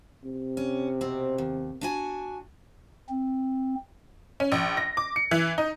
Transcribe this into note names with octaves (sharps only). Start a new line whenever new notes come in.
C3
C#4
B2 C4
D#2
D4 F#4 G#5
C4
C#4
A#1
A#6
D6
C#7
E3
D#4